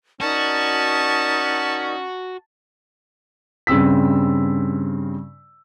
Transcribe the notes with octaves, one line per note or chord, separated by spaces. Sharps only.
C#4 D#4 F#4 A#4 D5 A5
G2 C#3 C4 E6 B6